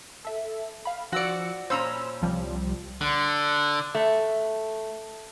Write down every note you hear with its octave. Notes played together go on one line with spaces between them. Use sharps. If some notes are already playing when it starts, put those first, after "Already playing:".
A4 E5
F5 B5
F3 F#4 D5 E6 C#7
A#2 C#4 C5 A#5 B5 E6
C2 F3 G3
D3
A3